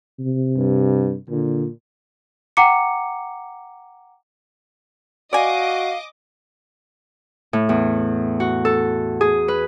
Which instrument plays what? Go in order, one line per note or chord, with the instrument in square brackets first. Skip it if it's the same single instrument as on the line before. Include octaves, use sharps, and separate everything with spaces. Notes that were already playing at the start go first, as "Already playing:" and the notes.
[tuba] C3
[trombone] G2
[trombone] A#2 [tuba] D3
[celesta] F#5 G5 A#5 D6 C#7
[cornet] F#4 [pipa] D5 G#5 [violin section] D#5 D6 [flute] F5
[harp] A2
E2
F#4
A4
G#4
B4